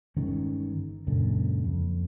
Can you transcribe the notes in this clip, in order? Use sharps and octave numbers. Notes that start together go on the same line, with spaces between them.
G1 D#3 G#3 C#4
C#2 F#2 A#2 D3
F2